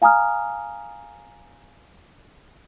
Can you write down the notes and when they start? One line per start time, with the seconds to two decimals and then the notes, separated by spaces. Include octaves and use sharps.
0.02 F5 G#5 A#5 D#6 F6